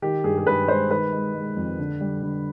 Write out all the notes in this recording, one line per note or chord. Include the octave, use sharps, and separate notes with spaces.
D#3 G4
G2 G#4
G#4
G2 B4
G#3 C5
D#3 B4
G#3
G#3
F2
D3
G3
D3